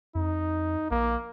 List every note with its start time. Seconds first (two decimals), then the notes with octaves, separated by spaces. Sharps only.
0.15 F2 D#4
0.91 A#1 A#3